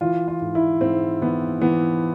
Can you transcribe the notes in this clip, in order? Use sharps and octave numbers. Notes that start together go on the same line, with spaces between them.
E3 F4
F4
G#2
E4
G#2 C4
E3 B3
E3 B3